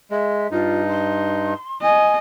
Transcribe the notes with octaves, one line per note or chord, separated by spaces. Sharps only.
G#3 E5
G2 D#4 F4
C6
D#5 G#5